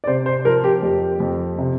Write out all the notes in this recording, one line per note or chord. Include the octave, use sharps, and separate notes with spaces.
D5
C3 C5
C5
F3 A#4
G4
F2 G4
F2
C3